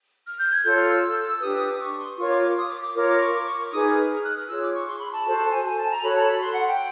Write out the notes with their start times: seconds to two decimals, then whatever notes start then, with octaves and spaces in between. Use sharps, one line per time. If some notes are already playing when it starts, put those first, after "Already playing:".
0.26 F6
0.39 G6
0.51 G#6
0.64 F4 A4 C#5 G6
0.76 F6
0.90 E6
1.02 E6
1.41 D4 G4 B4 D#6
1.54 D#6
1.66 D6
1.80 C#6
1.98 C6
2.18 F4 A#4 C#5 C#6
2.31 D6
2.44 D6
2.57 D#6
2.69 D6
2.82 D6
2.95 F4 A#4 C#5
3.08 D6
3.21 C#6
3.34 D6
3.45 C#6
3.59 D6
3.72 D#4 G#4 B4 D#6
3.91 F6
4.10 F6
4.23 F#6
4.36 F6
4.49 F4 G#4 C#5 E6
4.61 D6
4.74 C#6
4.87 C6
5.00 B5
5.12 A5
5.25 F#4 A4 C5 A5
5.38 A5
5.51 G#5
5.64 G#5
5.77 A5
5.90 A#5
6.02 F#4 A4 C#5 B5
6.15 A5
6.28 B5
6.41 C6
6.53 F#5
6.67 G5